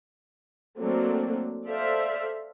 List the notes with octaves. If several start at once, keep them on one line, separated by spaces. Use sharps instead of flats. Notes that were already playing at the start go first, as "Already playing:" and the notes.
F#3 A3 A#3 C4 D4
A4 C5 D5 E5 F5